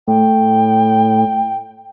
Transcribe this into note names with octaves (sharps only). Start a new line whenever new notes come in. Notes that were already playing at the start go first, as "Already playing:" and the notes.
A2 G5